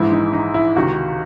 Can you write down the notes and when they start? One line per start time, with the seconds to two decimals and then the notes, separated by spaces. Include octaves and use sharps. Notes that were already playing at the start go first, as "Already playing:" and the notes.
Already playing: A#1 G#2 E3 G#3 E4
0.12 D#4
0.33 D#4
0.54 E4
0.76 C#2 C3 D#3 F#4